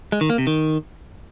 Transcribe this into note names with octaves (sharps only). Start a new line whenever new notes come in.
G#3
D#3
A#3
C3
D#3